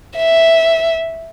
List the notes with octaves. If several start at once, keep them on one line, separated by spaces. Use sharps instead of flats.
E5